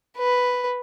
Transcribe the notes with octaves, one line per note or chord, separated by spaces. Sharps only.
B4